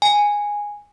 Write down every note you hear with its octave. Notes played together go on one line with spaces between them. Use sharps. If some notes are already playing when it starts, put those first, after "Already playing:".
G#5